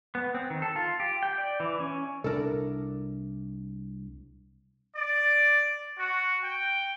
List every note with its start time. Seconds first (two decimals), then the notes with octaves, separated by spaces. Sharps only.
0.15 B3
0.35 C4
0.50 D#3
0.62 A4
0.76 F4
1.00 G4
1.23 G5
1.38 D5
1.60 E3
1.80 C#4
2.24 C2 D4 A4 A#4
4.95 D5
5.98 F#4
6.43 G5